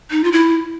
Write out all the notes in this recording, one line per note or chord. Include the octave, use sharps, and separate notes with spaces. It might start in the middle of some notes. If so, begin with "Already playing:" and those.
D#4
F4
E4